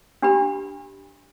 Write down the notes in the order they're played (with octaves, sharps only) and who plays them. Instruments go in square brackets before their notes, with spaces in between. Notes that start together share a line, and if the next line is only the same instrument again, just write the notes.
[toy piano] D4 G4 B5